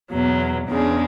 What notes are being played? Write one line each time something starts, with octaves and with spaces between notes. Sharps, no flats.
E2 B2 F#3
E2 C#3 G#3 D4